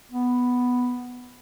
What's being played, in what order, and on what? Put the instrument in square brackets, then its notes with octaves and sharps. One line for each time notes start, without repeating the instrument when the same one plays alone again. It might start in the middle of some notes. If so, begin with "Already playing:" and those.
[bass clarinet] B3